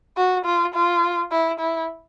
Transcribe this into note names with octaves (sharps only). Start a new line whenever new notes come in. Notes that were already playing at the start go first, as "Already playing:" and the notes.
F#4
F4
F4
E4
E4